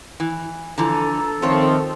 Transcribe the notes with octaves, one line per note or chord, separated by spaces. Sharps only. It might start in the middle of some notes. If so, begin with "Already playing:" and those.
E3
D3 E3 F3 A4 A#5
F2 D#3 F3 A3 C4 C#5 C6